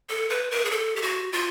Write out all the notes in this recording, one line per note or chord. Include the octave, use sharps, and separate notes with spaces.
A4
B4
A#4
G#4
A4
G4
F#4
F4